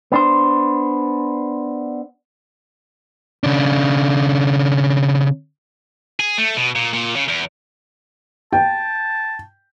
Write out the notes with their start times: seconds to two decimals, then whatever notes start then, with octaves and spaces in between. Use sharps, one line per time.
0.12 B3 D4 C5
3.44 C#3 D4
6.20 G#4
6.38 A3
6.57 B2
6.76 A#2
6.93 A#2
7.16 C#3
7.28 E2
8.53 G5 A5